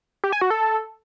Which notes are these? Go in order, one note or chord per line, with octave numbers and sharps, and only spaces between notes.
G4
G#5
F#4
A4